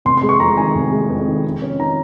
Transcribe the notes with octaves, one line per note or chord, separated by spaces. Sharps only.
F1 C6
C6
G#3
C#6
F2 A#5
D#3 G#5
F1
G#3
F2
D#3
F2
C#4
D#3 A#5